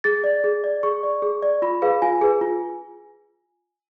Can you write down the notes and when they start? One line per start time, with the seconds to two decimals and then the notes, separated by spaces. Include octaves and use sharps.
0.04 G#4 A6
0.24 D5
0.44 G#4
0.64 D5
0.83 G#4 C#6
1.03 D5
1.22 G#4
1.43 D5
1.62 F4 B5
1.82 G#4 B4 F5
2.02 F4 G#5
2.21 G#4 B4
2.41 F4